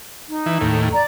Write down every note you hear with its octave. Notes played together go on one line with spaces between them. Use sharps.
D#4
E3
D#2 A2
D5 A#5